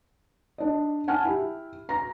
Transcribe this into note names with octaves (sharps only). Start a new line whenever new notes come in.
D4 D#5
F#5 G#5 A5 F6
E4 G4
A#5 A#6